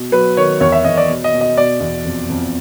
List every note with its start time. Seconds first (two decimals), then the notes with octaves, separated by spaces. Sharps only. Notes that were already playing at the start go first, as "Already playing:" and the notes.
Already playing: B2
0.12 F#3 B4
0.37 D#3 C#5
0.61 E2 C#5
0.72 E5
0.85 E2 D#5
0.97 D5
1.09 B2
1.24 D#5
1.33 B2
1.41 D#5
1.58 B2 D5
1.80 E2
2.05 F2
2.30 F2